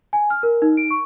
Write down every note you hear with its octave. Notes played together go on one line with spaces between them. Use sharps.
G#5
F6
A#4
D#4
D7
C#6